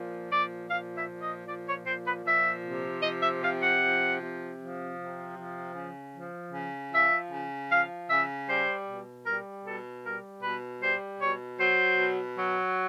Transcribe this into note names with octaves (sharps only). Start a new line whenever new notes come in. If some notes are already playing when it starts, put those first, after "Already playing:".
Already playing: A#2 F3
A#2 D5
F3 F5
E5
A#2
D#5
F3 D5
C#5
A#2 C5
B4
F3 E5
C3
F3 D#5
E5
C3 F5
F#5
F3
C3
F3
C3
F3
C#3
F3
C#3
F3 E5
C#3
F3 F5
C#3 E5
G3 C5
B2
G3 A#4
B2 A4
G3 A#4
B2 B4
G3 C5
B2 C#5
F#3 C5
B2
F#3